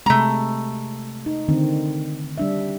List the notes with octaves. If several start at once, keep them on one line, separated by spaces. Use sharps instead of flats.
C3 G#3 A3 A#5
D#4
D3 D#3 C4
G3 D4 E5